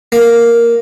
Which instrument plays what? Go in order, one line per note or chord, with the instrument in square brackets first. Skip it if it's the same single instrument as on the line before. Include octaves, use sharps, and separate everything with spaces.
[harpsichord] A#3